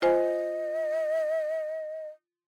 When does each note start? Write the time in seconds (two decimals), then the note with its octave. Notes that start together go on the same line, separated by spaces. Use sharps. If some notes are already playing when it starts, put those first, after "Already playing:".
0.02 F4 C5 D#5 G#5